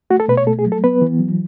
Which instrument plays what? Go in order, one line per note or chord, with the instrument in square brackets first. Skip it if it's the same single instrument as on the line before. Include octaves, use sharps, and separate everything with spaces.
[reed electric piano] A3 F#4
A4
B2 B4
C#5
A3 A4
G#4
F#3
A4
B3 B4
E3
F#3